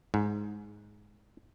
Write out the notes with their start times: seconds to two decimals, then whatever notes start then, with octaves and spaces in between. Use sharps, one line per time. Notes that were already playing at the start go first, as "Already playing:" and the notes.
0.14 G#2